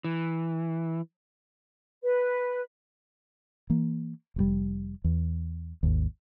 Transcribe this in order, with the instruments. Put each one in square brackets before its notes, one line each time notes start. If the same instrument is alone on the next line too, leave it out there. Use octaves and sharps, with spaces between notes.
[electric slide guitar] E3
[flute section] B4
[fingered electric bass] E3 A#3
F1 A#2 G3
E2
G#1 D#2